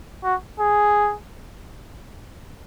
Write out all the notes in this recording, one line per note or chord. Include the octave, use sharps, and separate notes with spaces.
F#4
G#4